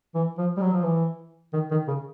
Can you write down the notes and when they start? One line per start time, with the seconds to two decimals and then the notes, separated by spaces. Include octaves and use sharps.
0.15 E3
0.38 F3
0.57 G3
0.61 F#3
0.73 F3
0.84 E3
1.53 D#3
1.71 D#3
1.88 C#3